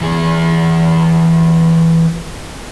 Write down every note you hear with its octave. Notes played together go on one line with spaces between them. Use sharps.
E3 G#4